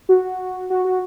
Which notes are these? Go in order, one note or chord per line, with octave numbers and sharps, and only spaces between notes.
F#4
F#4
F#4